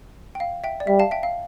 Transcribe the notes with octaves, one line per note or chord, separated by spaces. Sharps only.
G5
F5
E5 G5
D5
G3 E5
F5 A5
E5 G5
F5